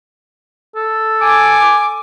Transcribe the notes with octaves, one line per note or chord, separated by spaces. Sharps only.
A4
G#5 D6